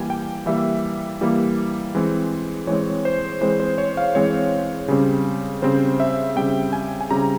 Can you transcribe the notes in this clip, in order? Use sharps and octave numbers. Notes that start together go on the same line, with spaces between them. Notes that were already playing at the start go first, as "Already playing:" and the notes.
Already playing: E3 G3 A#3 G5 G#5
G5
E3 G3 A#3 E5
E3 G3 A#3
E3 G#3 C4
E3 G#3 C4 C#5
C5
E3 G#3 C4 C5
C5
C#5
F5
E3 G#3 C4 C#5
C#3 G3 C4
C#3 G3 C4 C5
E5
C#3 G3 C4 G5
G#5
G#5
C#3 G3 C4 A#5